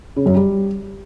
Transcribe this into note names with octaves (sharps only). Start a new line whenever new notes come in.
C#3
F#2
G3